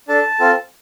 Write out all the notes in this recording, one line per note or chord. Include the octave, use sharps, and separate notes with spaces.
D4 A4 A5
C4 F4 A4